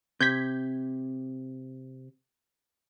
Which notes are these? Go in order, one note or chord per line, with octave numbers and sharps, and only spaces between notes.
C3 G6 G#6 B6